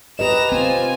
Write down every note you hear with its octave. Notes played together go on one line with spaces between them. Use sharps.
G4 B4 D#5 A#5 E7
C4 F4 G#5